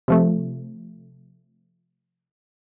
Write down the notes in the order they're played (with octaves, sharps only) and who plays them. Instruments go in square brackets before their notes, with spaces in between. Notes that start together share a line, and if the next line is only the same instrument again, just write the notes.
[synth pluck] C3 F3 A3